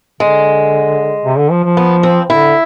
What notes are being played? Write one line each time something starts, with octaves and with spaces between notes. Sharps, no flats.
D3 G#3
C3
D3
F3
F3
B3
C4
D3 E4